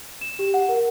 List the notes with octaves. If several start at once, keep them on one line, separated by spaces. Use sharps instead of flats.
E7
G4
F#5
A#4